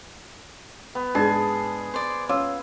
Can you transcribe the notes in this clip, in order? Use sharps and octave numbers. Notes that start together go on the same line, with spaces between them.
B3
G#2 D4 G#4 A5
C5 D5
C#4 F4 D6 E6